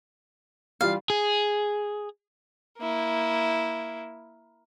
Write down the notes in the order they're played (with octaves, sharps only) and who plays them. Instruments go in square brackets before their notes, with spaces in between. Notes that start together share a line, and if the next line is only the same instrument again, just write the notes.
[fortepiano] E3 G3 F4 [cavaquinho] F5
[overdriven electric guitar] G#4
[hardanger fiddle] A#3 E4